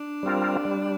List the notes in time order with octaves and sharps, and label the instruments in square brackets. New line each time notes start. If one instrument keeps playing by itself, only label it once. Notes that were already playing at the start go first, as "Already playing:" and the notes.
Already playing: [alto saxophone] D4
[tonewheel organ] G3 C4 F4 A#4
G3